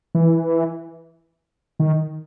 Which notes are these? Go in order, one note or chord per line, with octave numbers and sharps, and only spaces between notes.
E3
D#3